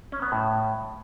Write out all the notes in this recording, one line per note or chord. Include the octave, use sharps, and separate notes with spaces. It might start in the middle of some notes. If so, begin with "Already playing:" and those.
C#4
B3
A2